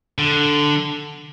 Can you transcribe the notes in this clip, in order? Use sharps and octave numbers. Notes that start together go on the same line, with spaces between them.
D3